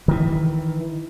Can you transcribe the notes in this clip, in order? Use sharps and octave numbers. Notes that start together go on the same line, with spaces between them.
D#3 E3